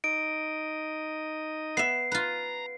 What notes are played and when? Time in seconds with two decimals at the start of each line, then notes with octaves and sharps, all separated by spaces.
0.04 D#4 D#5 D7
1.77 B3 E5 C7
2.12 F4 B4 A#5